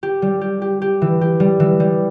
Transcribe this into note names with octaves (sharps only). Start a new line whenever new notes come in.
G4
G3
G4
G4
G4
E3
G4
G3
E3
G3